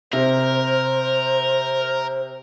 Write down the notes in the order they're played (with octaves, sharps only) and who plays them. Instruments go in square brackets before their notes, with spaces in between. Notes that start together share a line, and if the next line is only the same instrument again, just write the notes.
[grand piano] C3 [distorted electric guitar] A#4 [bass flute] C5